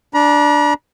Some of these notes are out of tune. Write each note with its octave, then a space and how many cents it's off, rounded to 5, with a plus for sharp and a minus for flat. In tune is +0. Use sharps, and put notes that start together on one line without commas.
D4 +0 A#5 +45